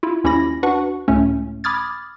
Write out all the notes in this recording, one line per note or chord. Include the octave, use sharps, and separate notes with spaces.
E4 F4
D#2 C#4 E4 G4 B5 A#6
D4 F#4 B4 F#5 C#6
C#2 A2 A3 C#4
B5 D6 D#6 F6 G#6 A6